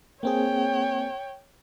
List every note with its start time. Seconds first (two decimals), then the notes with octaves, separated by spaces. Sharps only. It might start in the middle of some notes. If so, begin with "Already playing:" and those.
0.23 A#3 C4 G#4 C#5 G5